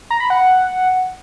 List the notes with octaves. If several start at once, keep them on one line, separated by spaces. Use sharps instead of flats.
A#5
B5
F#5